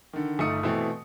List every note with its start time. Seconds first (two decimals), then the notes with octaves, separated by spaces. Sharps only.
0.13 D3 D#3
0.39 G1 A3 D#4 D#6 C#7
0.63 B2 E3 A3 C4